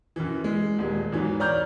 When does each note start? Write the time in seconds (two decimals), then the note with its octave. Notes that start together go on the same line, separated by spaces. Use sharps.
0.16 F#2 E3
0.44 G#3
0.79 D#1 G#3
1.12 E2 G#2 E3 F#3
1.40 C#5 D5 A#5 F6 G6